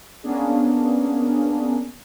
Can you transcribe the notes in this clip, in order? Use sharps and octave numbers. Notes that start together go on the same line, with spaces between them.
A#3 B3 C#4 D4 G#4